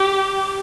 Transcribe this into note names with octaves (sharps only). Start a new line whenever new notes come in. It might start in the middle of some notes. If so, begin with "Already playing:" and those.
Already playing: G4